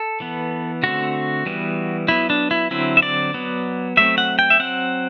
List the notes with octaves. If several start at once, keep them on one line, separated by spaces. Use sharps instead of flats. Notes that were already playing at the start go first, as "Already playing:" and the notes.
Already playing: A4
E3 B3
D3 A3 C4 F#4
E3 G3 B3
F#3 B3 E4
D4
E4
D3 F#3 C4 E4
E5
D5
F#3 B3
F#3 A3 C4 E5
F#5
G5
E5
F#3 C4 F#5